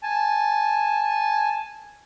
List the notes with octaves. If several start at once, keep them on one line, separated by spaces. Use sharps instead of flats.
G#5 A5